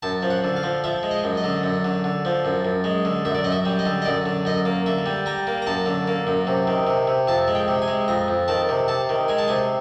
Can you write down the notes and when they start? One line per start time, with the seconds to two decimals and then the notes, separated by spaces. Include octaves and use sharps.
0.02 F#2 A5
0.23 F3
0.30 F#5
0.44 D3
0.56 F5
0.63 F3
0.84 F3 E5
1.03 G#3
1.11 D#5
1.24 F#2
1.37 D#5
1.44 D3
1.63 F#2
1.85 D3
2.04 D3
2.25 F3
2.45 F#2
2.65 F#2
2.84 G#3
3.05 D3
3.25 F#2 E5
3.35 D5
3.44 F#2 D#5
3.52 E5
3.65 G3
3.79 D#5
3.86 D3
4.02 D#5
4.05 F#2 D5
4.26 D3
4.45 F#2 D#5
4.65 A#3
4.86 D3 E5
5.06 G3
5.26 G3 A#5
5.47 A#3
5.62 A#5
5.67 F#2 A5
5.86 D3
6.07 A#3
6.27 F#2
6.47 C3
6.67 D#3
6.87 C3
7.07 C3
7.28 F2 A5
7.48 G#3
7.55 G5
7.68 C3
7.82 G#5
7.88 G#3
8.08 F2 A#5
8.28 F2
8.48 D#3 A5
8.69 C3
8.88 C3 A5
9.09 D#3
9.28 G#3 G#5
9.38 A5
9.48 C3 G#5